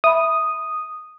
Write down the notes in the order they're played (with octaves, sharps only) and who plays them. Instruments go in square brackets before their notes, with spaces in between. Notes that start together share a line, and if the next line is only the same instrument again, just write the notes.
[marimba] E5 B5 [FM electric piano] D#6